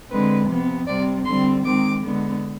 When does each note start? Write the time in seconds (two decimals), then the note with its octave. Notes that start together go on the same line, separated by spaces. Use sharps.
0.10 D3 G#3 C4 B4
0.49 C3 F3 B3
0.86 C3 G3 C4 D5
1.25 D3 G3 C4 C6
1.64 D#3 G#3 C4 D6
2.02 D3 G#3 B3